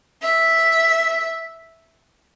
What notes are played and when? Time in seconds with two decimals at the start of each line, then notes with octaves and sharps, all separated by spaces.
0.22 E5